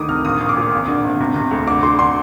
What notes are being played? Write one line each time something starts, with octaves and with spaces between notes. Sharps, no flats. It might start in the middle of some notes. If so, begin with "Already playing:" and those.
Already playing: D2 D3 D#3 D6 D#6
C3 F6
A#1 D#6
A#1
D6
A#2
G#1
D3
G#1
C3
C3
D2
D3 D6
D3 C6
D3 C6